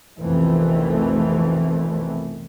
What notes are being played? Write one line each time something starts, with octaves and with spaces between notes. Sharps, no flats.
F1 B1 F2 D#3 E3 A3